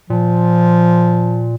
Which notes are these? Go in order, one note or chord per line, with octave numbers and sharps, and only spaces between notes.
A#2 F3